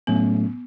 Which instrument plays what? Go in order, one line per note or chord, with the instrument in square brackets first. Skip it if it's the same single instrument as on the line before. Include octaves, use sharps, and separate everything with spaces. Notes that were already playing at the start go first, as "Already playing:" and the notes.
[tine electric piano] A2 F#3 A3 C#4 [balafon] B3